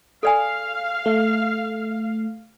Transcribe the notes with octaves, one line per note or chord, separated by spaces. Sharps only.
A4 D5 F5 G#5
A3